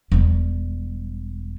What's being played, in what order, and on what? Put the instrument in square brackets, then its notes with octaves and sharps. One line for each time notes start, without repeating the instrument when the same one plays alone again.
[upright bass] E1 G3